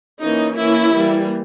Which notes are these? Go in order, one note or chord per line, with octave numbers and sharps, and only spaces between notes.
E3 A#3 C#4 D#4
E3 A#3 C#4 E4
E3 G3 A#3